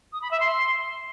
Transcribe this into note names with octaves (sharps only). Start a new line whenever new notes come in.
D#6
B5
E5
C6